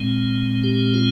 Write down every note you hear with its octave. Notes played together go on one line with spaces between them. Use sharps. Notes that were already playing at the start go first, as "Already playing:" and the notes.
Already playing: A#2 G#3 C4
G4
F4